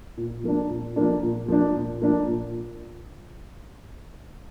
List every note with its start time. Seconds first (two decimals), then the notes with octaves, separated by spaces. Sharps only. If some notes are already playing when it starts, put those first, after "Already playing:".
0.17 A#2
0.44 F3 A#3 D4
0.70 A#2
0.96 F3 A#3 D4
1.23 A#2
1.48 F3 A#3 D4
1.75 A#2
2.02 F3 A#3 D4
2.28 A#2